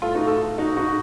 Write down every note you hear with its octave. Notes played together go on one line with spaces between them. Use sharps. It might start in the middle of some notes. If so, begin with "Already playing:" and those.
A2 A3 F4 A4
D#4 F#4
F4 A4
D#4 F#4
D#4 F#4